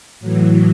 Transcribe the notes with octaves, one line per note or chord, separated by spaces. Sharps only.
A2 E3 F#3